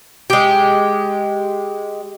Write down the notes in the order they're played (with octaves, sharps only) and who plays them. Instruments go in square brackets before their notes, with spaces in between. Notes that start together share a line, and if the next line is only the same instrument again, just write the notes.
[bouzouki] G#3 G4